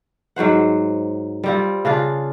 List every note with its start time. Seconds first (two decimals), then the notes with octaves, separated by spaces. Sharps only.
0.36 G#2 F#3 C5 F#5
1.44 G3 C4 F4
1.85 C#3 D4 F4